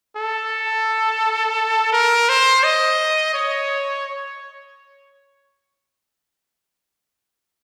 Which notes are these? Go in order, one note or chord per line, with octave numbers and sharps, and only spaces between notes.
A4
A#4
C5
D#5
C#5